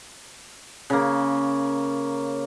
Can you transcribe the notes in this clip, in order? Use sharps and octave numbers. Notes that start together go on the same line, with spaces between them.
C#3 A#3